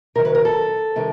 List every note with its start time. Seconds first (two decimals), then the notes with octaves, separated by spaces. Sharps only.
0.15 C3 D#3 F#3 A#4
0.25 B4
0.35 A#4
0.45 A4
0.96 C3 D#3 G3